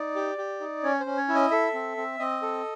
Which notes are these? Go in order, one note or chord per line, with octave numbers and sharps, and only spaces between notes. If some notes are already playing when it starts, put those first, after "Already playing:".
Already playing: D#4 D5
G4
G4
D#4
C#4 C#5
C5
C#4
C#5
E4
D#5
A4 E5
C4
C4
C4 D#5
A4